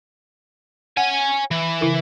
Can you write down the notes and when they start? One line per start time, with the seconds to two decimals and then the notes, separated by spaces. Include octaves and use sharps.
0.97 C#5 F#5 G#5
1.51 E3
1.81 C#3 E4 A#4